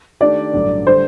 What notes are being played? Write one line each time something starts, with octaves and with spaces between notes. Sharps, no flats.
D#3 A3 D4 G4 D5
A1 G2 D3 F#3
D3 G3 C5